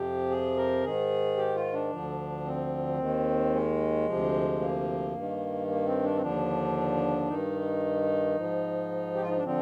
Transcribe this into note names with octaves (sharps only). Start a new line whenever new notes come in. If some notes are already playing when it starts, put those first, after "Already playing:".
Already playing: F2 C3 F3 G4
G#4
A#4
G#2 D#3 G#4
G4
F4
D4
D2 D3 F3
C4
D#2 D#3
G#3
D2 C3 F3
A#3
G2 D#3
A#3
C4
D4
C4
D#2 D3 F3 D4
G2 D#3 D#4
G#2 F3
G4
F4
D#4
D4
D3 F3 C4